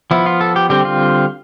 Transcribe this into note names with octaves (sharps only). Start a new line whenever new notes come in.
F3 B3 E4
F4
A4
G4
D3 G3 C4 G4
F4